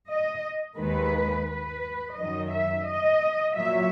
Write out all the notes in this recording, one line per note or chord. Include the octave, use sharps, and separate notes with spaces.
D#5
D#2 D#3 G#3 B4
B4
F#2 D#3 F#3 D#5
E5
D#5
A#2 F#3 E5